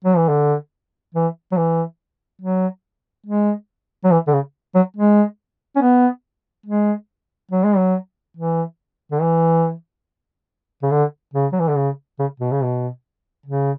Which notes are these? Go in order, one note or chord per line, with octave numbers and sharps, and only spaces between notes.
F#3
E3
D3
E3
F#3
E3
F#3
G#3
F#3
E3
D3
C#3
F#3
G#3
C#4
B3
G#3
F#3
G#3
F#3
E3
D3
E3
C#3
D3
C#3
F#3
E3
D3
C#3
C#3
B2
C#3
B2
C#3